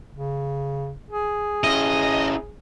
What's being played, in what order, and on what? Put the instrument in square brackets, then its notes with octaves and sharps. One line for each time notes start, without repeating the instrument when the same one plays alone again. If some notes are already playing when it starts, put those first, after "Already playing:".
[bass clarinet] C#3
G#4
[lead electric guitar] C#4 E4 [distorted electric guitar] D#5